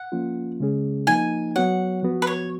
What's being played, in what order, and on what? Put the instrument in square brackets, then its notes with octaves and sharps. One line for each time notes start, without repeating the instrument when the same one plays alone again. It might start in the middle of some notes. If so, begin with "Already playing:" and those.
Already playing: [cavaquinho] F#5
[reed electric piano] F3 A#3 C#4 F4
C#3 G#3 C#4 G#4
[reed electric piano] F3 A#3 D#4 [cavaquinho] G#5
[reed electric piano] F#3 B3 F#4 C#5 [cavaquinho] F#5
[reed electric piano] F3 B3 F#4
[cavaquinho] B4
C#5